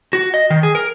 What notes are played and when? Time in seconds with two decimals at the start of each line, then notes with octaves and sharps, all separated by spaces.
0.13 F#4
0.34 D#5
0.50 D#3
0.63 G#4
0.75 A#4